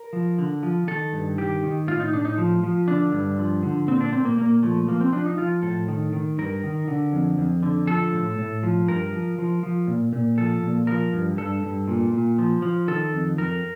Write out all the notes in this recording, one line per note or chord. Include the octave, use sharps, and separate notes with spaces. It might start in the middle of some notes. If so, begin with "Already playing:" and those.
Already playing: A#4
F3
D3
F3
D#3 A4
G2
D#3 G4
D#3
A2 F4
D#4
A2 D4
D#4
F3
F3
D3 D4
G2
F3
D3
A#2 C4
D4
A#2 C4
A#3
A#2 A#3
F3 A3
F3 A#3
C4
F3 D4
D#4
F3 F4
A2 A4
D#3
D#3
G2 A#4
D#3
D3
F2
F2
D3
F3 A4
A2
A2
F3
G2 A#4
F3
F3
F3
A#2
A#2
F3 A4
A#2
F3 A#4
G2
G2 A4
G2
A#2
A#2
F3
F3
D#3 A4
F2
F2 A#4